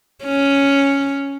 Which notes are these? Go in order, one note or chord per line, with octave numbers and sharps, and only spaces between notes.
C#4